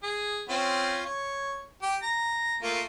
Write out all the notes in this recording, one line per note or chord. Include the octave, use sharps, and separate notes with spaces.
G#4
C4 C#4 F4
C#5
G4
A#5
A3 A#3 F4